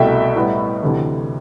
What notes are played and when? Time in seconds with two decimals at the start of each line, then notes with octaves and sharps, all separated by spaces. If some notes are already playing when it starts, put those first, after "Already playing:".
Already playing: C2 B2 A3 E5 G5
0.36 A2 G3 B3
0.82 D2 C3 E3 A3